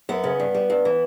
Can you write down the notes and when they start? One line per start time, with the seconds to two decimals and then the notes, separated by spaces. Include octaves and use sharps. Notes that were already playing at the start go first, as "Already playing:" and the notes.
0.09 F#2 B3
0.24 C#3
0.39 G2
0.54 G3
0.70 G2
0.85 E3